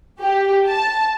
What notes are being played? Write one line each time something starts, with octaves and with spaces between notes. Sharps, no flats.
G4
A5